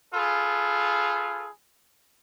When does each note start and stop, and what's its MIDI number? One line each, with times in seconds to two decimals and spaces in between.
0.14 1.48 65
0.14 1.48 68
0.14 1.48 69
0.14 1.48 71